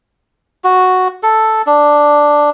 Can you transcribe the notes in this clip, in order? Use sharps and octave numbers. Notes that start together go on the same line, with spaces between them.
F#4
A4
D4